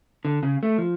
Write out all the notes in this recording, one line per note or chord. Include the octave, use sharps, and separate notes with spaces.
D3
C#3
A3
F3